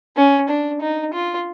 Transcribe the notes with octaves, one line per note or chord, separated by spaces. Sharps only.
C#4
D4
D#4
F4